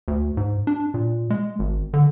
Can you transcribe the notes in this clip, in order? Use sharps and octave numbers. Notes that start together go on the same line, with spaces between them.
D2
G#2
D4
A#2
G#3
G#1
D3